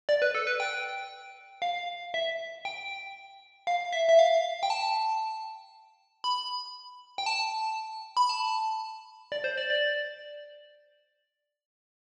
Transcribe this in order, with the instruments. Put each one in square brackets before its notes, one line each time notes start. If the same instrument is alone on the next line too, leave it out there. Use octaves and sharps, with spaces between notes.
[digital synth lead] D5
B4
A4
B4
G5
F5
E5
G5
F5
E5
E5
F5
G5
A5
B5
G5
A5
B5
A5
D5
C5
D5
D5